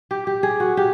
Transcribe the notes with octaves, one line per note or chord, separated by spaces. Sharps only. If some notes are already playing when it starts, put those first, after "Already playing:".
G4
G4
G#4
F#4
G4